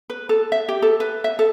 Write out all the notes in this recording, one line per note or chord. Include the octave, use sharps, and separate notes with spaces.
B4
A4
E5
G4
A4
B4
E5
A4